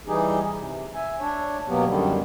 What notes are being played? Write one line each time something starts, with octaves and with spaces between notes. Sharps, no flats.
E3 G3 D#4 G4 G#4
C3
E5 G#5
D4 C#5
B2 F#3 A#3 B3 G4
F#2 D3 D#3 G3